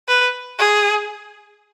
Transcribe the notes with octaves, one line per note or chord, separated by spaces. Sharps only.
B4
G#4